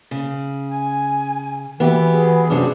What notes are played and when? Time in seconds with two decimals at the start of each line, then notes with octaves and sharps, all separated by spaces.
0.11 C#3
0.70 G#5
1.80 E3 B3 F#4 G4 E5
2.12 G#4
2.50 F#2 C3 D4 F#4